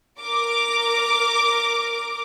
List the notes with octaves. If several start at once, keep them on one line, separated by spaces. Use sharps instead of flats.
A#4 D6